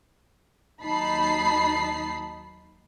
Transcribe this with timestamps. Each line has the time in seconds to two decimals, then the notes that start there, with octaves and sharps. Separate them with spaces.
0.82 D#2 F#3 D#4 A5 B5 C7